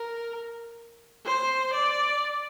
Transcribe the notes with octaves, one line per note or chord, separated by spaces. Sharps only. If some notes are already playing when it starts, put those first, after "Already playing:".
Already playing: A#4
C5
D5